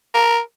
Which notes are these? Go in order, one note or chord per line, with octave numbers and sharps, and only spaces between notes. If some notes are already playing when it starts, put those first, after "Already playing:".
A#4